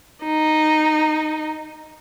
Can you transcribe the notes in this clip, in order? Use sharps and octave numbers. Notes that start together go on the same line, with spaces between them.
D#4